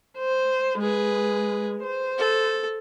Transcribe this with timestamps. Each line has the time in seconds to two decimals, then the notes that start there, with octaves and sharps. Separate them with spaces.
0.18 C5
0.81 G#3 G#4 B4
1.83 C5
2.18 A4